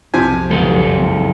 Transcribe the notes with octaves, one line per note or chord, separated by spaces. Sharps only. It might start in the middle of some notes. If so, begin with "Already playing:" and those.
B1 F2 C3 F3 G#5
F#2 C#3 A4